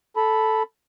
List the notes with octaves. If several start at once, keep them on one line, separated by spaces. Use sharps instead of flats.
A4 B5